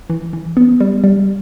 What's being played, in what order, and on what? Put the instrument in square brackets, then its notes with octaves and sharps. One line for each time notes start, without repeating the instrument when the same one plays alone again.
[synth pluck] E3
E3
B3
G3
G3